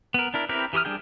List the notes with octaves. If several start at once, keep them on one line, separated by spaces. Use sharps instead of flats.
B3 A#4
D4 E4 A#4
C4 E4 G4 A#4 B4
E3 G4 C6 D#6 F6
G3 D4 G#4 G5